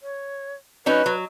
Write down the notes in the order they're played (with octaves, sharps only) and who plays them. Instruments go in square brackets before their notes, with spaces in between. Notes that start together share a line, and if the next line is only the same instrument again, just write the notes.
[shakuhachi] C#5
[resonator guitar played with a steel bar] F#3 C#4 D#4 [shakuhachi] B4
[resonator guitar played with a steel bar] F#3